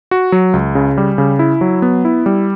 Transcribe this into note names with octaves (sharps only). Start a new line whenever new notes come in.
F#4
F#3
C#2
C#3
G3
C#3
E4
F#3
B3
E4
G3